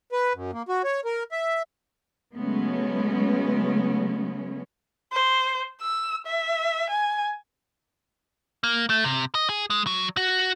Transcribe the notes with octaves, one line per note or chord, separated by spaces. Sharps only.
B4
F#2
A#3
F#4
C#5
A#4
E5
C#3 F#3 G#3 A3 B3 C#4
C5
E6
E5
G#5
A#3
A3
C3
D#5
G#4
G#3
F#3
F#4